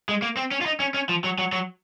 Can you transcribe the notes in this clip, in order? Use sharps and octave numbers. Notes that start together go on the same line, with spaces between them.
G#3
A#3
C4
C#4
F4
D#4
C#4
C#4
F3
F#3
F#3
F#3